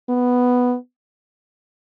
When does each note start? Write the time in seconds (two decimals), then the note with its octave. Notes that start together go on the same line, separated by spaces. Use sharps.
0.09 B3